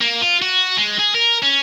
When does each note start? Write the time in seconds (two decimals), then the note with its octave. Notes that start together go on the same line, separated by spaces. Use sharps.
0.01 A#3
0.22 F4
0.42 F#4
0.77 G#3
0.99 G#4
1.15 A#4
1.43 C#4